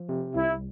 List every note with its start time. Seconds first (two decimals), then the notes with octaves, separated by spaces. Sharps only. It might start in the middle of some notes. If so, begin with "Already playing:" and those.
Already playing: F3
0.09 C3
0.35 C2 E4